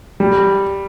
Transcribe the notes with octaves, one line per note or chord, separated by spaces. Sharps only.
G3